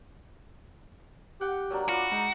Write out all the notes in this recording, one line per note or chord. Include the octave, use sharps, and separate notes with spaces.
G4 F#5
F#3 A#3 D4
F4 F#4 F5 B5 D6
G#3 D#4 A#5